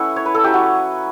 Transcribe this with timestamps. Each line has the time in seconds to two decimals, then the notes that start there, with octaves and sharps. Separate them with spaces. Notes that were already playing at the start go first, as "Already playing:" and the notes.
Already playing: A3 C#4 E4 A4 B4 F#5
0.16 C#5
0.26 B4
0.35 A4
0.44 F#3 C#4 E4 G4
0.54 F#4